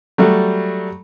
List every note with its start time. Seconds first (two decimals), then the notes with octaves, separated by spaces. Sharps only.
0.18 F#3 G3 A3